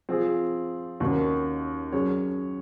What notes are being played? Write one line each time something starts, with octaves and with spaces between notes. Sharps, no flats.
F3 C4 F4 G#4
D#2 D#3 A#3 C#4 F#4
F#3 C#4 G#4 C#5